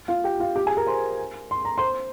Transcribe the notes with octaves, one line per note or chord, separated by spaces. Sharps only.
F4 F5
G4 G5
F4 F5
G4 G5
G#4 G#5
A#4 A#5
C5 C6
C6
A#5
C5 C6